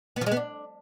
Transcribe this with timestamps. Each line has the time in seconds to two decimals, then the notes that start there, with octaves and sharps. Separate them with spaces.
0.16 B3
0.21 F3
0.26 G#3
0.31 B3
0.37 D4